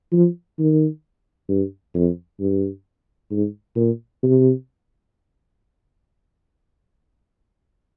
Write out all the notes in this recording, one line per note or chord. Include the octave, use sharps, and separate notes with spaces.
F3
D#3
G2
F2
G2
G#2
A#2
C3